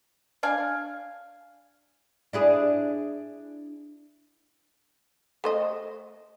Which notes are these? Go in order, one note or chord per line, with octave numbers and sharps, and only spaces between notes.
D4 F5 G#5
D4 E4 G#4
A3 C5 D#5